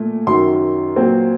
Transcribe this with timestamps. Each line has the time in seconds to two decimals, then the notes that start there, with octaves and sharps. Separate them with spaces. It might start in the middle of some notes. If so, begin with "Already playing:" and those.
Already playing: A#2 A3
0.27 F#2 D#3 F#3 C6
0.96 A#2 F#3 C4